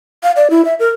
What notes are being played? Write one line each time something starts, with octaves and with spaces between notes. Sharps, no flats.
F5
D5
E4
E5
A#4